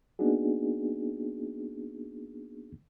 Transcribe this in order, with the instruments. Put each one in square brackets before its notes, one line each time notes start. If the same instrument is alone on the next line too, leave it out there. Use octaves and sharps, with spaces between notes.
[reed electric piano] A#3 B3 D4 D#4 F#4 G#4